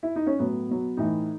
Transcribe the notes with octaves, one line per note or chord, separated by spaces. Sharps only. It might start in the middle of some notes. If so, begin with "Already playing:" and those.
E4
D#4
C#4
A2 F#3 B3
B2 F#3
A2 E3 D#4